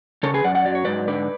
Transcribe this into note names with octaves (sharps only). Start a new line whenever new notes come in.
C#3 A4 C#5
G#4 B4
F#2 D5 F#5
D5 F#5
F#3 D5
C#5
G#2 B4 D5
D3 B4 D5